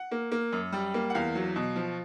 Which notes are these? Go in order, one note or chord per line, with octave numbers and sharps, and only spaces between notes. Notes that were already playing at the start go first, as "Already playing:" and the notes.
Already playing: F#5
A#3
A#3
F#2
G3
A#3
F#5
E2 F5
F#3
B2
F3